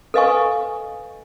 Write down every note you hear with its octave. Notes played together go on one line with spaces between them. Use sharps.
A4 B4 D#5 F5 G#5 C#6